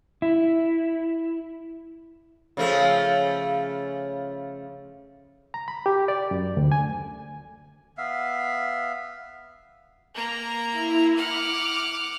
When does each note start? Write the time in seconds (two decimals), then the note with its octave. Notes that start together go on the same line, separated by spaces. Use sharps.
0.22 E4
2.57 C#3 F3 A3
5.54 A#5
5.68 B5
5.86 G4
6.08 D5
6.31 F#2
6.57 D2
6.72 G#5
7.98 B3 E5 F5
10.14 A#3 A#5
10.70 E4
11.16 F#5 D6 F6